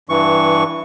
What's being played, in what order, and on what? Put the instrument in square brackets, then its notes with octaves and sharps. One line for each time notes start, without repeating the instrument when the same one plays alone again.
[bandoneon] G2 E3 C#6